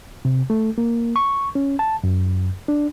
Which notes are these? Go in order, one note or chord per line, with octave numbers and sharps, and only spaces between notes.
C3
A3
A#3
C#6
C#4
A5
F#2
D4